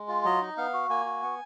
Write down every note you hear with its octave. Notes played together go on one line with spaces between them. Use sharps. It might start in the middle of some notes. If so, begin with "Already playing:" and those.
Already playing: G#3
F4
F#3 D#5
D#4
B3 F5
F#4
A#3 G#5
F#4
B3